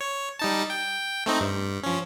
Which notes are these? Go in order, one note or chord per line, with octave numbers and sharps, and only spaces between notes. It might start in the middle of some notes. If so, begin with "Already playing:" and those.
C#5
G3 D#4 A5
G5
A3 C4 D#4
G2
F3 C#4